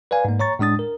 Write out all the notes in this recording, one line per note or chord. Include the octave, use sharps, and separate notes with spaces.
B4 D5 F5 G#5
G#2 A#3
C#5 A#5 C#6 A6
A2 G#3 D4 D#6 A6
A#4